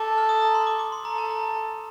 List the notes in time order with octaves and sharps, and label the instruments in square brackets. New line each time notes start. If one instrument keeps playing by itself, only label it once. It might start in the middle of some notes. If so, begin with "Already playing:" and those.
Already playing: [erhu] A4 [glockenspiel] D6
[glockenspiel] F6
D#6
A#5
C6
D6
D6
C6
[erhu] A4 [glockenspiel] A#5
[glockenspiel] A5
A#5